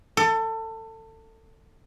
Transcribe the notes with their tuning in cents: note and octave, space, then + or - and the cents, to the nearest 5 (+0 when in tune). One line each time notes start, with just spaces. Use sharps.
A4 +25